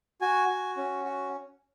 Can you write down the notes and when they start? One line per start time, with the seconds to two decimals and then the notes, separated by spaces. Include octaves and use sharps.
0.21 F#4 G#5
0.49 F#4
0.77 C#4
1.05 F#4